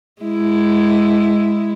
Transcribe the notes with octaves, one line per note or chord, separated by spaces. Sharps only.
G#3 E4